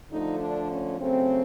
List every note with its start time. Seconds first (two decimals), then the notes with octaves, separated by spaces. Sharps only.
0.10 D3 F3 A3 D#4
0.40 D4
0.71 C#4
1.00 C#3 F#3 A3 C4